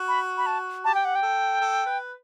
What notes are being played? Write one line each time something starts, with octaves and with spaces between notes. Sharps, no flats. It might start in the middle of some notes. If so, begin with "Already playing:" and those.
Already playing: F#4
B5
B5
A5
G4 A5
G5
F#5
G5
A4
A4
B4